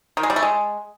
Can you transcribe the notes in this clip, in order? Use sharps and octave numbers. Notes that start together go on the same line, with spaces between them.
D#3
G#3
G3
A3
G#3